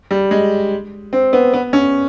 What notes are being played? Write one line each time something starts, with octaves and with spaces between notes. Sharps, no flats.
G3
G#3
C4
B3
B3
C#4